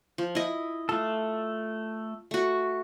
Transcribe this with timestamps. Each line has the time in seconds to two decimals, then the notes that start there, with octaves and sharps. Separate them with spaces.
0.18 F3
0.35 E4 D#5
0.89 A3 F4 A4
2.31 A3 F#4